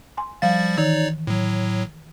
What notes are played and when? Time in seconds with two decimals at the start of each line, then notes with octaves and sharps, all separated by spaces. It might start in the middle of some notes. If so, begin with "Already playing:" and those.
0.17 G#5 C6
0.42 F3 G3 F5 A6
0.78 D#3 E3 D#4 C#5 D5
1.27 A2 F#3